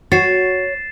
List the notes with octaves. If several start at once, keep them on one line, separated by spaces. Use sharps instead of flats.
F#4 C#5 A6 C7 E7